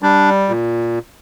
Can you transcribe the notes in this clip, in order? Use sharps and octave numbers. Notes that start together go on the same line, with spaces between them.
G3 D4
A#2